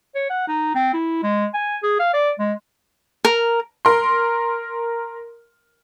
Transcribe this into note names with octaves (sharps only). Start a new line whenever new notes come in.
C#5
F#5
D#4
C4
E4
G#3
G#5
G#4
F5
D5
G#3
A#4
A#4 C6